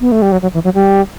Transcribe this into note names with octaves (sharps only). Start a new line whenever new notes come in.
B3
A3
G3
F#3
F#3
E3
F#3
G3